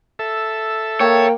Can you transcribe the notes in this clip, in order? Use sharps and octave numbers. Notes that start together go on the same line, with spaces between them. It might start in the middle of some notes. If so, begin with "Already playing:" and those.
A4 E5
A#3 C#5 G5